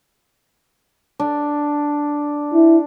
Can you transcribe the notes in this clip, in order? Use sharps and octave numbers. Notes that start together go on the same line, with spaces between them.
D4
E4